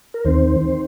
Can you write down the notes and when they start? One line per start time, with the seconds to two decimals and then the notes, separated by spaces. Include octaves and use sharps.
0.14 A#4
0.25 D#2 D#3 C4 C5
0.64 D#3 C4